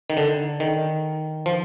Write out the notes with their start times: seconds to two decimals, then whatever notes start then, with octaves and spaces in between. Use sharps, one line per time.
0.10 D#3
0.17 D3
0.60 D#3
1.46 F3